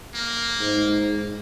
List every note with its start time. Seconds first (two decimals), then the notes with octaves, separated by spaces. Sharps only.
0.14 A#3
0.60 G#2